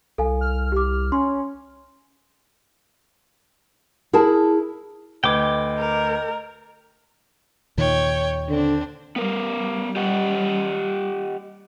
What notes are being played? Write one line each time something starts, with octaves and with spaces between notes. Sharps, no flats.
C2 A4 F5 G#5
F6
G4 D6
C#4 C6
E4 G#4 A#4 A5
D2 B4 D#5 G5 D6 G#6
A#4
D#2 A#2 D#3 C#5 G5
D3 C4 D4
G3 B3 A#4
G4 D#5 F#5